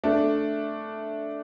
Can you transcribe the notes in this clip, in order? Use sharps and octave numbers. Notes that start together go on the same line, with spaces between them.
A3 D4